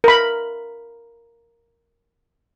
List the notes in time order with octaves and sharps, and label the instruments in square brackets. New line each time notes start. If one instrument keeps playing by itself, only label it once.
[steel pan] A#4 B5